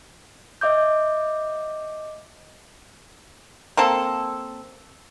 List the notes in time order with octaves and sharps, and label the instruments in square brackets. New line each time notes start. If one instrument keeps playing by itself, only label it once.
[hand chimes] D#5 E5 D6 G6
[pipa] A#3 C4 A4